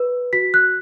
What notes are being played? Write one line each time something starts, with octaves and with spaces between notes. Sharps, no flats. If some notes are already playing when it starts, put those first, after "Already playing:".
Already playing: B4
F#4 B6
F#6